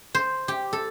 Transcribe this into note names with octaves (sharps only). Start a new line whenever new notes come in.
C5
G4
A4